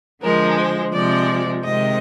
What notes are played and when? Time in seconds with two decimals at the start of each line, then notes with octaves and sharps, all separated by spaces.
0.22 D3 F3 G#3 A#4
0.58 C5
0.93 C3 F3 G#3 D5
1.64 C3 D#3 G#3 C4 D#5